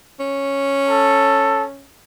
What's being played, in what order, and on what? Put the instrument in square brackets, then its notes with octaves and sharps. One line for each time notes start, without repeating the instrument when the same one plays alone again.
[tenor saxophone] C#4
[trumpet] A4